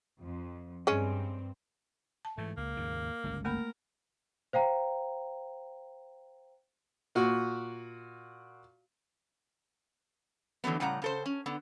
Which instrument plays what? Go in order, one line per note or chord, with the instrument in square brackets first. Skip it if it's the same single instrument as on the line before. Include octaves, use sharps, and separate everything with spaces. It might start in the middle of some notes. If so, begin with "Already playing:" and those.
[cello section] F2
[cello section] G2 C4 [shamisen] G#3 C#4
[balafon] A5
[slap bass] G#2 E3 [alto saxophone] A3
[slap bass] C#2 [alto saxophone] A#3
[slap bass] D#2 G#2 C#3
G1 C#2 C#4
[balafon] A3 A#3 B5 [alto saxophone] A#4
[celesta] C5 F5 G5 A#5
[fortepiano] A#2 F#4
[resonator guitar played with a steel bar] D3 E3 F#3 A3 B3
A2 C#3 G3 F#5 A#5
C#3 A4 C5
C#4
D3 B3